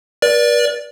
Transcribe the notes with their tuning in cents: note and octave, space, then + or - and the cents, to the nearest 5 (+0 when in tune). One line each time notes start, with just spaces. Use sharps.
B4 -45 D5 -5